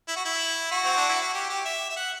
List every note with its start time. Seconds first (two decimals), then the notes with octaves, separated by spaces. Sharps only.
0.08 E4
0.17 F#4
0.25 E4
0.71 F#4
0.84 C4
0.97 D4
1.09 E4
1.21 F#4
1.34 G4
1.50 G4
1.65 E5
1.90 E5
1.97 F#5